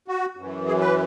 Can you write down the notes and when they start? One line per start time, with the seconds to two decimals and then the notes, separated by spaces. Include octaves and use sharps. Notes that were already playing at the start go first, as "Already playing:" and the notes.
0.08 F#4
0.37 F#2 E3
0.67 G#4
0.81 B4